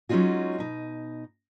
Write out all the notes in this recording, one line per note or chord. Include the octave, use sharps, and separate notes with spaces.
F#3 G#3 C#4 D#4 F4 F#4
B2 D#4